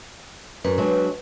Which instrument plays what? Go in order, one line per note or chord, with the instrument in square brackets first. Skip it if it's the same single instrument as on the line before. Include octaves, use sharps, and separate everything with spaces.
[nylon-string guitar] F#2 [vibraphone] B4
[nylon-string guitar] F#3 G#3 D4